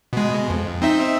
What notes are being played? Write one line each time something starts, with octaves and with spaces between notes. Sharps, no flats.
B2 G#3
F2
C4 D#4 E5